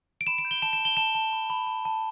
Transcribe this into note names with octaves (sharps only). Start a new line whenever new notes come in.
D7
B5 E7
D7
G6
G7
A5 E7
E7
A5
G7
A5 E7
A5
B5
B5
A5
A5